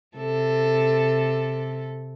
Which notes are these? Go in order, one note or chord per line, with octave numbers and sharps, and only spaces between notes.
C3 A4